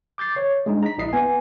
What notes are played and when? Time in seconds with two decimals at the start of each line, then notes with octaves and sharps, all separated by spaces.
0.18 D6 G6 A6 C7
0.36 C#5
0.66 G#3 D4 D#4
0.83 A#5 B6
0.98 A#1 E4 D#5 C7
1.13 B3 G#5